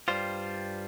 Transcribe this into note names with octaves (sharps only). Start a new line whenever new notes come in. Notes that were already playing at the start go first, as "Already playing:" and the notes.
G2 G3 F4 C5